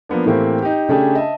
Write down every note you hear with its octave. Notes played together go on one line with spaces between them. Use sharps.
F3 A#3 B3 D4
A2 E3 A3 A#3 C4 G4
D#4 G4
C#3 A3 C#4 D4 G4 G#4
D#5 E5 A5